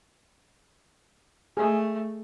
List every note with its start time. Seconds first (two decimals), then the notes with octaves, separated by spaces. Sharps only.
1.57 A3 G#4